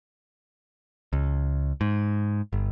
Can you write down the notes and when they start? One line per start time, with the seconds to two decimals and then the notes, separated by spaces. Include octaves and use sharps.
1.13 C#2
1.81 G#2
2.53 G1